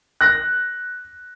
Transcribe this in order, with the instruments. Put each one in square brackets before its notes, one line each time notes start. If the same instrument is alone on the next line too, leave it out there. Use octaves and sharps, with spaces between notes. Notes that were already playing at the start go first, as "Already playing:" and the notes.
[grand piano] F#6 A#6